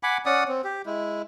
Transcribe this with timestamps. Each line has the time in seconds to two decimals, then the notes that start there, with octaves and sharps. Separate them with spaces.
0.03 F#5 G#5 B5 D6
0.26 C#4 D5 F#5 D#6
0.48 C4
0.64 G4
0.86 G#3 E4